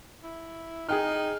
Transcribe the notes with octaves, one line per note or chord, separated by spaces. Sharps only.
E4
D#4 G#4 G5 F6